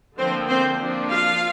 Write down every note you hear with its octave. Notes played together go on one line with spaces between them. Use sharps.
D3 F3 A#3 C4 C5
C4 C5
F3 A#3 D4
F4 F5